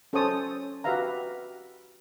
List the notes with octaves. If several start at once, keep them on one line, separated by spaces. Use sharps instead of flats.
C#4 A4 C5 C#5 A5 D#6
F#4 G4 B4 E5 F5 A#5